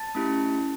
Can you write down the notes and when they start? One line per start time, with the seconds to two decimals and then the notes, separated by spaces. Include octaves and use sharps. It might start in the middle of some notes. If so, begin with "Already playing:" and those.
Already playing: A5 A6
0.15 A3 C#4 E4 G4